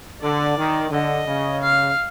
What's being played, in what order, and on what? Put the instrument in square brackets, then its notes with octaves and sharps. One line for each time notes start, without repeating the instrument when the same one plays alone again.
[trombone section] D3 [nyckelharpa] D5
[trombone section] D#3
[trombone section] D3 [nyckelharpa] D#5
[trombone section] C#3
[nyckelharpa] F5